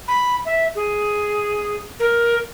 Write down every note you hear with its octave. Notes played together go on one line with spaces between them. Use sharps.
B5
E5
G#4
A#4